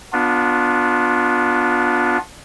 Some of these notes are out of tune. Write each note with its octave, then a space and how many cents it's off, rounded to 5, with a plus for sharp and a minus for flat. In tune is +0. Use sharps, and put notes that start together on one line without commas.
B3 +0 D4 +0 F4 +25